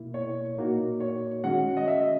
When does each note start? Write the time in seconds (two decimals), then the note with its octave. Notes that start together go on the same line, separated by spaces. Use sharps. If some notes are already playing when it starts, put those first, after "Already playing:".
Already playing: B2 A#3 E4
0.14 C#5
0.57 A#2 A#3 D#4 F#4
1.00 C#5
1.44 D#3 G#3 C#4 F#4 F#5
1.77 D#5
1.88 E5
2.02 D#5